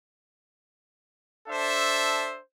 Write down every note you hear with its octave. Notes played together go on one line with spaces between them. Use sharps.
D4 A4 C5 E5